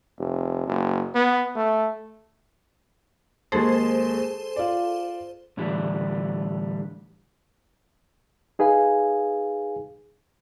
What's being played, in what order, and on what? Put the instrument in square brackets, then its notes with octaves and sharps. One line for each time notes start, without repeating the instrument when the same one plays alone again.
[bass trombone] F1
F#1
B3
A3
[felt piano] D#2 G#3 [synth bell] G#4 A4 C5
[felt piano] F4 D5
[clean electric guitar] A2 D3 E3 G3
[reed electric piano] D#4 G#4 B4 F5 G#5